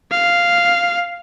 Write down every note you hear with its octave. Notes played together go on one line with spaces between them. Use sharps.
F5